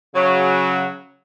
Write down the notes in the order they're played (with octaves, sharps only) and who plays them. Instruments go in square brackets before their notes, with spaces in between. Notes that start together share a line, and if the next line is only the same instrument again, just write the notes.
[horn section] C#3 F#3